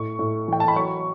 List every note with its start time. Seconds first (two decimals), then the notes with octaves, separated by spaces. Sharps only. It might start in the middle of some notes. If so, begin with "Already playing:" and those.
Already playing: A2 C#6
0.19 A2
0.48 E3 G5
0.60 A5
0.68 B5
0.76 F#3 C#6